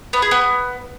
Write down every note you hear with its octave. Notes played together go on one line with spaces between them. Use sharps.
B3
G#4
B3